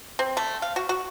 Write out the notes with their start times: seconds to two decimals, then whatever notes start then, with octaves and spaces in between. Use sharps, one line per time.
0.19 C4
0.37 A3
0.62 F5
0.76 F#4
0.89 F#4